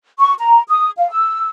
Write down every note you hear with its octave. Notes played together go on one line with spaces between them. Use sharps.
C#6
A#5
D#6
F5
E6